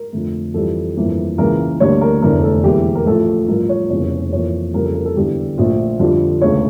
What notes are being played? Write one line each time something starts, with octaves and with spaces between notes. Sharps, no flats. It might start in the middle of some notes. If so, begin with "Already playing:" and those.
Already playing: A#4
F2 D3 A3
F2 E3 G3 A4
G1 F2 E3 A#3
C#2 C#3 E3 A#3 A#4
D2 D3 G3 A#3 C#5
A#4
F1 E2 D3 A3 A#4
A4
E1 E2 E3 A#3 G4
A#4
A1 A2 F3 A3 A4
A1 G2 F3 A3 A#4
C#5
F1 E2 C#3 G3 A#3 C#5
F2 E3 A#3 C#5
F2 C#3 G3 A#3 A#4
A4
A#4
A4
E2 D3 G3 G4
A#1 A#2 A3 F4
F2 D3 G3 F4
E1 D2 C#3 C#5